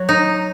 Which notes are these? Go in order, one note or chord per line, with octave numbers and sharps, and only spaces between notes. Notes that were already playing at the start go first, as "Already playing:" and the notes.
Already playing: F#3
D#4